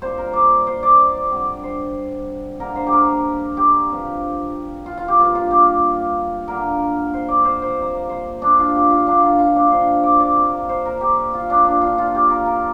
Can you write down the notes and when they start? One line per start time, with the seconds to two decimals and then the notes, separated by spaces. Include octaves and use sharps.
0.02 A#2 G3 C4 C5
0.18 A#4
0.33 D5
0.67 C5
0.83 D5
1.31 D3 G3 C4
1.64 C5
2.60 D3 A#3 A#4
2.76 C5
2.87 G4
2.93 A#4
3.57 G4
3.90 G2 F3 C4
4.86 F4
4.97 F4
5.08 G4
5.19 G2 G3 A#3 F4
5.35 F4
5.51 G4
6.48 D3 A#3 A#4
7.13 C5
7.28 D5
7.45 C5
7.62 C5
7.78 C3 G3 A#3
8.09 C5
8.42 D4
8.59 F4
8.75 G4
8.91 F4
9.07 D3 G3 A#3 D4
9.23 F4
9.39 F4
9.56 D4
9.72 C5
10.04 D5
10.20 D5
10.36 C3 A#3
10.69 C5
10.85 A#4
11.01 G4
11.34 F4
11.50 D4
11.65 A#2 A#3 D4
11.82 F4
11.98 F4
12.15 G4
12.30 A#4
12.46 A#4